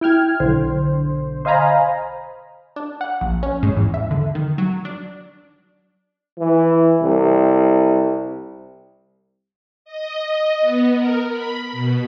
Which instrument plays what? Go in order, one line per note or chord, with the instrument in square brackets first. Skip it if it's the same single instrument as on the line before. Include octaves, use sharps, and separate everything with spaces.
[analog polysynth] E4 G5 F6 G#6
B1 D3 C5
C5 D#5 F5 G#5 A#5 B5
[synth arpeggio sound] D4
F#5
A#1
C#4
G#2
E2
E5
D3
D#3
F#3
D4
[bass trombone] E3
C2
[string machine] D#5
D#5
B3
A#4
B5
B2